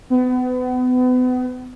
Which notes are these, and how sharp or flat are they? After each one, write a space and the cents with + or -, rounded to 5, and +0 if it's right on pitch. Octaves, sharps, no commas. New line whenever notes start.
B3 +35